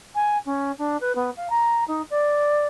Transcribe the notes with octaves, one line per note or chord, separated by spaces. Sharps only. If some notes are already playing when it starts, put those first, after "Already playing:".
G#5
C#4
D4
B4
B3
F5
A#5
D#4
D5